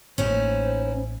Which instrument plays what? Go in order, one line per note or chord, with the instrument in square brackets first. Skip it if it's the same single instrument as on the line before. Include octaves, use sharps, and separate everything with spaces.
[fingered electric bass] A1 A3 A#3 [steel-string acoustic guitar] C#4 D#4 E4 [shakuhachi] C5